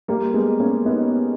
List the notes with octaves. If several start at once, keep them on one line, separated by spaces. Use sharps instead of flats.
G3 A#3
G#3 B3
A#3 C#4
B3 D#4